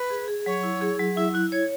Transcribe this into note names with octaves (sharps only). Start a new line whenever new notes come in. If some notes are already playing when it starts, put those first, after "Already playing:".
Already playing: B4
G#4
G#4
F#3 C#5
E4
G#4
F#3
E4 E5
E4 F#6
C#5 G#6